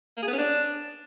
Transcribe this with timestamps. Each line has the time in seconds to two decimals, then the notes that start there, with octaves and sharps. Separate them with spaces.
0.17 A#3
0.22 G#4
0.28 B3
0.33 C#4
0.38 D4